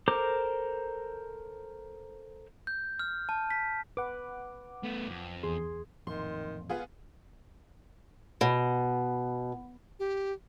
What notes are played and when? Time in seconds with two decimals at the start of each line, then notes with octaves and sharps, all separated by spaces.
0.08 A4 A#4 C5 A#5 D6
2.67 G6
2.99 F6
3.29 A5
3.50 B6
3.97 B4 F#5 D6
4.83 A3 B3
5.08 F2
5.43 E2 G#4 C6
6.07 A1 F2 A#2 D#3 C6
6.70 B3 F4 G#4
8.41 B2
9.99 G4